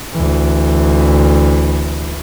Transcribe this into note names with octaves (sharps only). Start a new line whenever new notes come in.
D2 E3